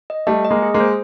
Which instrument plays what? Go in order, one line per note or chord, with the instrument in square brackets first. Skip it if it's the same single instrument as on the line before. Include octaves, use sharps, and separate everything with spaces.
[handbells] D#5
[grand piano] G3 A3 [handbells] D#5
[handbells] D#5
[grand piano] G#3 A#3
[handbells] G#4
[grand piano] G#3 A#3
[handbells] C5